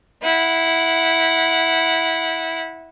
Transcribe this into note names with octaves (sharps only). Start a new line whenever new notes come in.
E4 F#5